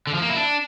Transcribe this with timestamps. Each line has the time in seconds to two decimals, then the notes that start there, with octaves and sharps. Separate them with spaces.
0.07 D3
0.15 F3
0.22 A#3
0.29 E4
0.37 D4